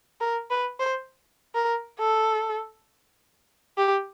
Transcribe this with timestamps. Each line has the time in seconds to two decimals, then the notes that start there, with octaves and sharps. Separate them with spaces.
0.21 A#4
0.51 B4
0.80 C5
1.55 A#4
1.99 A4
3.78 G4